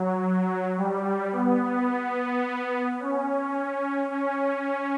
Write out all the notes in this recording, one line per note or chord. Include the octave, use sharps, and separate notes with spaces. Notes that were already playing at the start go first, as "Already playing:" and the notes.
Already playing: F#3
G3
B3
C#4
C#4